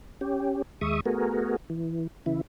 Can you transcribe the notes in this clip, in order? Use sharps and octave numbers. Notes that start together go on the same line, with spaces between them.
C#4 G4
D#2 G#3 E5 C#6 D#6
A3 B3 F#4 G#4 A#4
E3
C#3 E3 E4